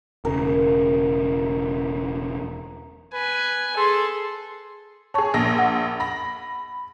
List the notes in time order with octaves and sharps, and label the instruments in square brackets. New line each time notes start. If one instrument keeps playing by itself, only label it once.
[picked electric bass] E1 C#3 [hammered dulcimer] A#4
[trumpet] B4 [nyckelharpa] G#5
[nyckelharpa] G#4 [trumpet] A4 [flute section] C6
[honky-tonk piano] G#4 C#5 [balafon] A5 C#6
[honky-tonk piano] A#1 A#3 A#6
[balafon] F#5
[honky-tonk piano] B5 A#6